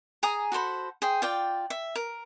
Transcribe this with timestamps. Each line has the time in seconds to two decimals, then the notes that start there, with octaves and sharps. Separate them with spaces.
0.23 G#4 G#5 A#5 D#6
0.52 F#4 A4 C5 B5
1.02 G#4 C5 G5
1.22 F4 D5 G5
1.70 E5
1.96 A#4